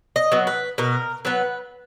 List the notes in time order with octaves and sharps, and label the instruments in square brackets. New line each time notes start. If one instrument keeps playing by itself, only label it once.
[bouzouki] D#5
F#3 B3
B4
B2 A#4
F#3 B3 B4